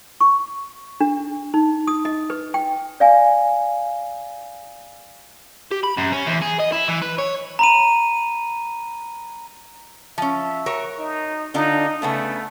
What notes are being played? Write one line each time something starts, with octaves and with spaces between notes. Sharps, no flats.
C#6
D4
D#4
D#6
D#5
B4
G5
D5 F5 G#5
G4
B5
F#2
C#4
E2
G#4
D#5
E4
E3
B4
C#5
A#5 B5 D#7
F3 C#4 E5
F#4 A#4 C#5
D#4
D3 D4 D#4 F4
C#3 A3 B3 D4